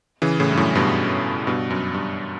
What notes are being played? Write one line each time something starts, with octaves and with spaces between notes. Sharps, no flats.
C#3 E3
A2 C#3
G2
F#2 A2
G2 B2
G2 B2
F#2
G2